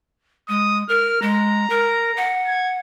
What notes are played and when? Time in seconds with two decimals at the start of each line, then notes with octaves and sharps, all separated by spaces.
0.49 G#3 D#6
0.89 A#4 F6
1.22 G#3 A#5
1.70 A#4
2.17 F#5
2.46 G#6